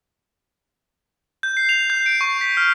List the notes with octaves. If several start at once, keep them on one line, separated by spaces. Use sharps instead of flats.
G6
C7
F7
G6
D7
C#6
B6
F6